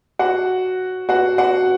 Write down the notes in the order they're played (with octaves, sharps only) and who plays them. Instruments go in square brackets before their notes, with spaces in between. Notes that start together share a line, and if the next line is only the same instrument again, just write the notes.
[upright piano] F#4 F#5
F#4 F#5
F#4 F#5